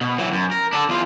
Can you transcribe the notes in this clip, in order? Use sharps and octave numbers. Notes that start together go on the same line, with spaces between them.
B2
E3 F#3
F#2
A#4
D4 A4
E2 F4